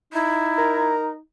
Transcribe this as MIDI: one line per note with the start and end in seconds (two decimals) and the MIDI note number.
0.13 1.19 63
0.13 0.91 64
0.58 1.10 70